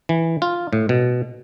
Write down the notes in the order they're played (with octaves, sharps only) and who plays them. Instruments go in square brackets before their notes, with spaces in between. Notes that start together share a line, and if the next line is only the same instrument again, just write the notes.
[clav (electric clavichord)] E3
F4
A2
B2